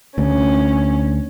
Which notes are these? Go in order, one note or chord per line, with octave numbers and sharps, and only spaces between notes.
D2 C#4